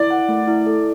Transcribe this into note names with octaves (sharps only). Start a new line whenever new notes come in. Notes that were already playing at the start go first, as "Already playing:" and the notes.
Already playing: E4 D5
F#5
A3
E4
A4